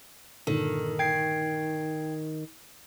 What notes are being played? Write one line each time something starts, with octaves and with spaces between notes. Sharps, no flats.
G2 A#2 D3 D#3 A4
G5 G#6 C7